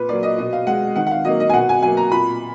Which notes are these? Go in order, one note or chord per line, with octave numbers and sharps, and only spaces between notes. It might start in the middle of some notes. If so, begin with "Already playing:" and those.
Already playing: A#2 B4
F#3 A#3 D5
D#5
B2 D#5
F5
G#3 F#5
D#3 F#5
F#5
F5
F#3 A#3 D#5
D#5
G#5
B2 F#5
G#5
F#3 A#3 G#5
A#5
A#2 B5